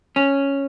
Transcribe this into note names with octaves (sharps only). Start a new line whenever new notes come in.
C#4